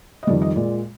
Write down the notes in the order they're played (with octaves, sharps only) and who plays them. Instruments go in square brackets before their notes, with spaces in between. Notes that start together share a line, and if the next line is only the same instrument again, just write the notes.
[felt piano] D#5
F2 D#3 G3 D5
D#5
A#2 G#3 D5